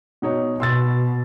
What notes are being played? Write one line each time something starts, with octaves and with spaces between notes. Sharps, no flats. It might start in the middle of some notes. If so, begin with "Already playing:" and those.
B2 D#4 C#5
B2 C6 E6 A6